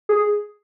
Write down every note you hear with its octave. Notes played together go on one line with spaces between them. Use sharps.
G#4